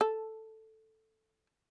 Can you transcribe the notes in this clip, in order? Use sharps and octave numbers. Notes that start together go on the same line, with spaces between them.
A4